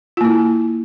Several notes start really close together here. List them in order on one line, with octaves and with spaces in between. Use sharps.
F4 A#3 E4